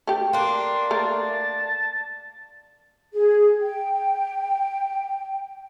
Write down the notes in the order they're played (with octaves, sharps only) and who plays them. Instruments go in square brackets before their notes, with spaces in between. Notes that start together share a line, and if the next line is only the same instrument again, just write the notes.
[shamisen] A3 G4
[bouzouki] A#3 D4 [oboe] C6
[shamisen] A3 A#4 [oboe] A5
[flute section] G#4
G5